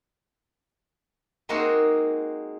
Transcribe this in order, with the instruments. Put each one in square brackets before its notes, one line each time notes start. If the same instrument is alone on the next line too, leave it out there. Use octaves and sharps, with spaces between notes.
[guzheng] G#3 A#3 C4 D#4 F#4 G#4